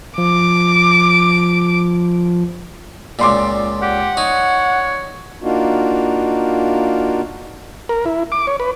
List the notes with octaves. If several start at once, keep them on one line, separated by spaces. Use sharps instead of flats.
F3 D6
C#2 A#2 D5 C6 D6
G4 F#5
D#4 C#5
A#3 D4 D#4 F4 F#4
A#4
E4
D6
C#5
B4